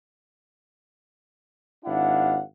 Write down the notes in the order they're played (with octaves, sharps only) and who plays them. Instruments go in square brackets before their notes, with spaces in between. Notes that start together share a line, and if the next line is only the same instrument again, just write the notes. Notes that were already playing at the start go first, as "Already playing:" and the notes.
[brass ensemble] G#1 D4 E4 F5 F#5